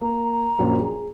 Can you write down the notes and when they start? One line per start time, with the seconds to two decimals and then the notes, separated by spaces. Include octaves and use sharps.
0.01 A#3 A#5
0.59 A#1 F#2 A#3
0.80 G#4